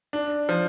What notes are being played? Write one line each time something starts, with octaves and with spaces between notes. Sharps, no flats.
D4
F3